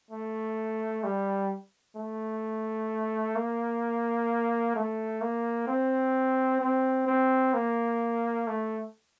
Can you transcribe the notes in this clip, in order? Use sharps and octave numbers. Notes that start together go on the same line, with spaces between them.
A3
G3
A3
A#3
A3
A#3
C4
C4
C4
A#3
A3